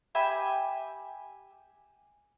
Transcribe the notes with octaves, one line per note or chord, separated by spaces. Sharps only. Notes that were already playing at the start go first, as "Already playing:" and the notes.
G4 E5 G#5 B5